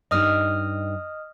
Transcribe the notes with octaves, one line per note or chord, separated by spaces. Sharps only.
G2 D#4 D#5 D#6 F6